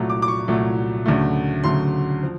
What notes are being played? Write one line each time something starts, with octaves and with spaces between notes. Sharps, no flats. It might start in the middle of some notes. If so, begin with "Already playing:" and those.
Already playing: C2 A#2 F#3 A3
D6
D6
C#6
C2 A#2 F#3 A3
D2 C#3 F#3 A3
D2 C#3 F#3 A3 C6
F3